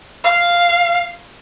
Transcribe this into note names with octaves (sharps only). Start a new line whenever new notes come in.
F5